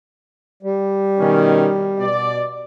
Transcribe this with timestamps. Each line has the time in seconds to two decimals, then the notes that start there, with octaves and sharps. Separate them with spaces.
0.63 G3
1.20 B2 D#3 C#4
1.99 B2 D5